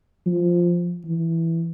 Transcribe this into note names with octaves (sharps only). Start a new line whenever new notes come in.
F3
E3